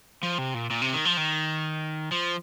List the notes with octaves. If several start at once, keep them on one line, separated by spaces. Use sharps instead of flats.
F3
C3
A#2
A#2
C3
D#3
F3
D#3
F3